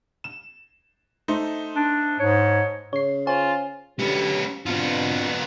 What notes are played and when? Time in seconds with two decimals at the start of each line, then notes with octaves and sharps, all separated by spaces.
0.24 E7
1.28 A3 D#4 C5
1.76 D4
2.20 G#2 C#5
2.93 C#3 C#5 C7
3.27 F4 C5 C#5 G#5
3.99 D3 F#3 B3 C#4 G4
4.66 B2 B3 C4 D4 F4